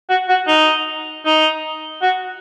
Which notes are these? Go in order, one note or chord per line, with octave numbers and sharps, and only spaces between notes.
F#4
F#4
D#4
D#4
F#4